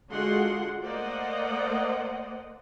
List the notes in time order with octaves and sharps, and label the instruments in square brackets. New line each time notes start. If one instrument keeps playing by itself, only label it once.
[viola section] D3 G#3 F4 F#4 F#5 C6
A3 A#3 C5 D5 D#5 F#5